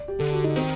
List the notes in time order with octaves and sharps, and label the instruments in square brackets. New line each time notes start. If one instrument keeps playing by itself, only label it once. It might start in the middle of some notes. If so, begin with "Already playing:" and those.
Already playing: [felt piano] D5
G4
[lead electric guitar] D3 [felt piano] A4
[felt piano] F#4
D#4
[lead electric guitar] D#3 [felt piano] C4